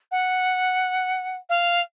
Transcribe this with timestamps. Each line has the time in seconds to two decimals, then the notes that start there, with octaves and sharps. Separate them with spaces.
0.11 F#5
1.49 F5